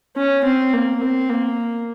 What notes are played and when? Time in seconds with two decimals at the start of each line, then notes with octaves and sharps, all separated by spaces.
0.17 C#4
0.44 C4
0.73 A#3
1.02 C4
1.29 A#3